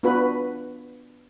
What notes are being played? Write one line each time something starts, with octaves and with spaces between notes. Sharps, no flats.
B3 D4 F4 F#4 B4 B5